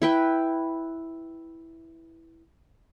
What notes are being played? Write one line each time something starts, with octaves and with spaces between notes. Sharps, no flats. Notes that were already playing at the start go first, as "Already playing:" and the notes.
E4 B4 G5